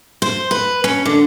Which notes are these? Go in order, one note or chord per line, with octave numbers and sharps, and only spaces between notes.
C5
B4
C#4
D3